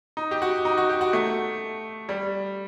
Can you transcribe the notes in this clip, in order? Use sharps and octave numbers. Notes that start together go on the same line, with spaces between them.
D#4
G4
F#4
D#4
F#4
G4
F#4
A3
G3